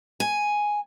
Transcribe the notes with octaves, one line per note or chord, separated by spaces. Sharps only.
G#5